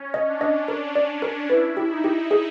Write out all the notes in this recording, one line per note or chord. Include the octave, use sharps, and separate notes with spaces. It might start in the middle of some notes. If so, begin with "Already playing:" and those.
Already playing: C#4
D#5
D4
D#5
D4 A#4
D5
A#4
E4 B4
G4
D#4
G4
G#4